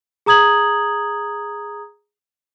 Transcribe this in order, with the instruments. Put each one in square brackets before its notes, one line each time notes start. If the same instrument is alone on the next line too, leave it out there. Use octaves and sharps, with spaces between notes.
[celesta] G#4 A#5 D#6 G#6 F#7